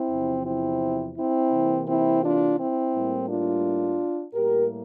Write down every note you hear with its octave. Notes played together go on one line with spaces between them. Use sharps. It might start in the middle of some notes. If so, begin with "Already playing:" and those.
Already playing: C4 E4
E2 C3 F3
C4 E4
C4 E4
C3 E3 A#3
C4 E4
D4 F4
C4 E4
A2 G3 A#3
D4 F4
A2 G3 A#3 G4 A#4